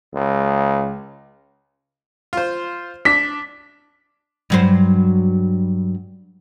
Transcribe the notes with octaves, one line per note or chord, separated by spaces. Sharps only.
C#2
F4 C5
D4 B6
G2 F#3 C5